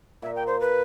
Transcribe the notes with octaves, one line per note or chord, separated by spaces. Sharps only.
A#2 A#4 E5
G5
C5
B4